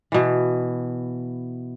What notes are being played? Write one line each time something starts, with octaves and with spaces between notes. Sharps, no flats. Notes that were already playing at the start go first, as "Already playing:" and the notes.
B2 E3